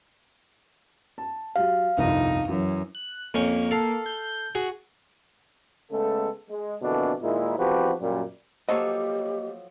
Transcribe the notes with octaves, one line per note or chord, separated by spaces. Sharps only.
A5
F#3 G4 F5
G1 C2 F2 D#4
F#2 E3
F#6
F2 A#3 C#4 C#6
A4 F5
G6
F#4 G#4
C#3 G#3 A3 B3 A4
G#3
F2 B2 D3 E3 A#3 D4
D#2 A#2 G#3 D#4 E4
E2 F3 C4 F#4 G4 B4
F#2 A#2 G3
F3 F#3 A#3 G4 A4 C#5 D#5